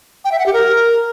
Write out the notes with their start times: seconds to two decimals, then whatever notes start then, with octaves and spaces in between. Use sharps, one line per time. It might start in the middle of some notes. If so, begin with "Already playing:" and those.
0.25 G5
0.32 E5
0.39 F#5
0.46 G4
0.53 A#4